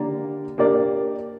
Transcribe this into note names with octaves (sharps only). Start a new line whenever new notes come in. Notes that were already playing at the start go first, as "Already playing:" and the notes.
Already playing: D3 A#3 G4 A#4 D5
A#3 D4 G4 A#4 D5